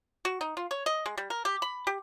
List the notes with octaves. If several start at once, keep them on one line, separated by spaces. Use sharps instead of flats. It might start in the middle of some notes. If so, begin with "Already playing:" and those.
F#4
D#4
F4
C#5
D#5
G#3
G3
A#4
G4
B5
G4